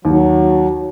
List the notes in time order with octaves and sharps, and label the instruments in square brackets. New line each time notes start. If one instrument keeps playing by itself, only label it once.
[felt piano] D#2 [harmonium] F#3